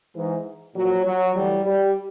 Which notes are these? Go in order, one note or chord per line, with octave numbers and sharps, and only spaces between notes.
G#2 E3
A#2 F3 F#3
F#3
A2 E3 G3
G3